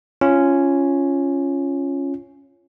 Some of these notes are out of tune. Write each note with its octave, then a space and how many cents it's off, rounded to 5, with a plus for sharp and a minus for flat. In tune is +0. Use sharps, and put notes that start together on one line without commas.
C#4 +0 F4 -15